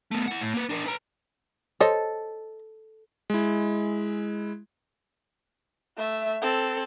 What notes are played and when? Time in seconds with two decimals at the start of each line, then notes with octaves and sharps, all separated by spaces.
0.11 A3 B3
0.28 E4 F#5
0.41 A2
0.54 A#3 B4
0.69 D4 A#4
0.86 B4 A#5
1.80 A4 C5 C#5 D#5
3.30 G#3 E4
5.97 A3 E5
6.42 C4 A4